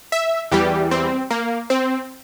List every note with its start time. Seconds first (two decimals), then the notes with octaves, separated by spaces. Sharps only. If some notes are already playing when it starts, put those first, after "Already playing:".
0.12 E5
0.52 E2 E3 G3 G4
0.91 C4
1.31 A#3
1.70 C4